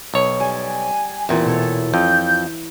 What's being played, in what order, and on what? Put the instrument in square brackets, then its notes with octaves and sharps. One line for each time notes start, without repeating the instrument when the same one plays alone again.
[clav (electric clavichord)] B1 C#5
[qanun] G3 [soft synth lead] G#5
[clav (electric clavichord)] E2 A#2 [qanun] E3 G3 C4
[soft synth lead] B2 [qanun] A4 C#5
[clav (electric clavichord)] F2 [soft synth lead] G6